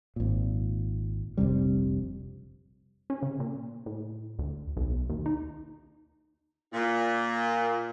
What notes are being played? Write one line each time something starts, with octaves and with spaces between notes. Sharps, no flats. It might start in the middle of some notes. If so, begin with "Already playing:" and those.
G#1 A#2
F1 A#1 C3 G3
C#4
C#3
A#2
A2
D2
B1
D#2
D#4
A#2